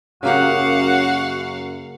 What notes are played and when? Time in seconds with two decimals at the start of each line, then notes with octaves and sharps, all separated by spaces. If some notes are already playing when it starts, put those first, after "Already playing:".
0.23 F#2 C#3 A#3 F#4 G4 F5 F#5